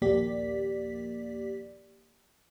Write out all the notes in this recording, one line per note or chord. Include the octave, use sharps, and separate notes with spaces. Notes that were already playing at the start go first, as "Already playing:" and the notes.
A#1 D#2 A#3 G4 D5 B6